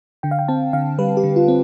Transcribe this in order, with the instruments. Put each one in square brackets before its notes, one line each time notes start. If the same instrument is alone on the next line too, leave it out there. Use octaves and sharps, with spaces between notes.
[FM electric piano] D3 G5
F5
G5
C4 A5
D3 F5
G3 B4
G4
D3
F4
C4